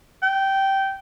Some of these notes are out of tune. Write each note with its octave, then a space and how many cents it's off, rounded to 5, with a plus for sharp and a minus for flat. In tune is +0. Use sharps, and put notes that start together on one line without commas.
G5 -15